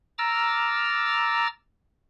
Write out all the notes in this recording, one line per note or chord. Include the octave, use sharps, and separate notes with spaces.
A#5 D6 E6 F6 A6